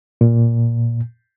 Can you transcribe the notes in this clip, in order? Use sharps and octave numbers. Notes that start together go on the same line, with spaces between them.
A#2